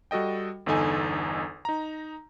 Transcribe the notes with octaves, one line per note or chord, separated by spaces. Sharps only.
G3 F#4 A4 D#5 G5
G1 E2 D3 D#4 A4 G#5
D#4 A#5